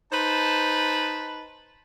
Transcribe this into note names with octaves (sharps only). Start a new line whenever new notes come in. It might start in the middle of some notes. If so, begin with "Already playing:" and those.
D#4 B4 C5 A5